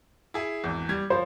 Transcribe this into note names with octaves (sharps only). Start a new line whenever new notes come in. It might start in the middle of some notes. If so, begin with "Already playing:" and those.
E4 G#4
G#1 E2
G3 G#6
F3 C5